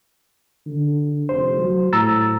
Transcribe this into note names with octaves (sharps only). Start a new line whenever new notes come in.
D3
F1 C5
F#3
A2 A#5 E6 A6